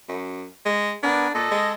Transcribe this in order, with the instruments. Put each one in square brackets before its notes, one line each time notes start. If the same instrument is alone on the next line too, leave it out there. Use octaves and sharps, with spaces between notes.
[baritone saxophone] F#2
G#3
[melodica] B3 A#4 G#5 [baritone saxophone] D4
[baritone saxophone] A#2 [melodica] A4 D#5
[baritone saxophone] G#3